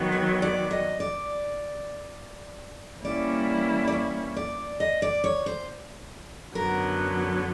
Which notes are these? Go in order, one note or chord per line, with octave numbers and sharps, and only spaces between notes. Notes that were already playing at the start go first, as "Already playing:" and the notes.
Already playing: D#3 F#3 B3
C#5
D5
D#5
D5
E3 G3 A#3 C#4 E4 D5
D5
C#5
D5
D#5
D5
C#5
C5
F#2 D3 F#3 B3 A#4